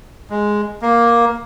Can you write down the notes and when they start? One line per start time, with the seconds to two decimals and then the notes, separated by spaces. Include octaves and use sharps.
0.30 G#3
0.82 A#3